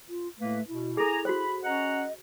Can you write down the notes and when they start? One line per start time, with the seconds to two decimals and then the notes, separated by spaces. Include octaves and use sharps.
0.09 F4
0.39 A2 A3 A#3 B4
0.68 B2 E4
0.97 G#4 A4 G#5 A#5
1.25 F#4 C5 B5
1.64 C#4 D#5 F#5 A#5